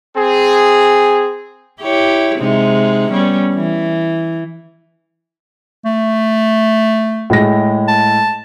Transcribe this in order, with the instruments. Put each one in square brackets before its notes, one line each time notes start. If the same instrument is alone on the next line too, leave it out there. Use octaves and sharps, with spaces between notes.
[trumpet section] C4 G#4
[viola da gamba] E4 G4 C#5
C3 G#3 D#4
G3 B3 C#4
E3
[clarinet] A3
[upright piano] A2 G#3 A#6
[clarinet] A5